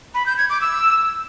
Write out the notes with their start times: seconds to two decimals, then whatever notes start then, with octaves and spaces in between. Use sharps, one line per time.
0.15 B5
0.26 G6
0.38 G#6
0.50 D6
0.61 E6